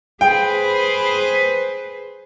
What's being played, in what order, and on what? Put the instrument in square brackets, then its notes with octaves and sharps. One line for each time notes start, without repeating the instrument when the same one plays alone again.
[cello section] G#4 B4 C5 [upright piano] G5